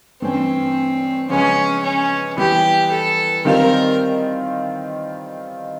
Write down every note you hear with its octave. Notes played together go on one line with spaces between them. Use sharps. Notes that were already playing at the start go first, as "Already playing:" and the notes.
G2 E3 A3 C4 C#4
C#3 F3 G#3 B3 C#4
C#4
E3 G3 B3 E4 G4
A4
D#3 G3 C4 F4 A#4